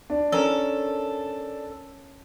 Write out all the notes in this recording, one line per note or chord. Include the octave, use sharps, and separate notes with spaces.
D4
C#4 A4 A#4